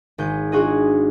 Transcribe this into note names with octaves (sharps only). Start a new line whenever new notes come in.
G#1 G#4 G6
D4 F4 F#4 G#4 D#5